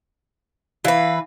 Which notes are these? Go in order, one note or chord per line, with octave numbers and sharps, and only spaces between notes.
E3 B4 F5